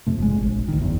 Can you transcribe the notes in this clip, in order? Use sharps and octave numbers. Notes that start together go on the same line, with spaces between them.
F2 C3 A3
G1 G#3
A#1
D2 D#3
F#1 E2